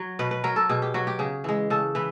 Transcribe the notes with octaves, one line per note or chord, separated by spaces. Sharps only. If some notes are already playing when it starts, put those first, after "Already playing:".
Already playing: F#3
B2 B4
B4
F#3 A#4
A4
B2 G#4
G4
F#3 F#4
G4
C#3 G#4
E3 G#3
C#3 A4
E3 B4